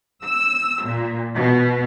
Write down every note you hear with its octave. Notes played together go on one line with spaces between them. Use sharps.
E6
A#2
B2